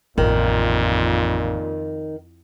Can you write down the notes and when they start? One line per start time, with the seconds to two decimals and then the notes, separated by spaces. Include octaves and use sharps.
0.18 A1 F2 A#2 D#3